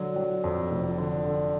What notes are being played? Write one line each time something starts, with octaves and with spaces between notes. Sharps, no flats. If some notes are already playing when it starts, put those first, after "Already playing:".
Already playing: D3 F#3
F#3
F2
F1
D3
D3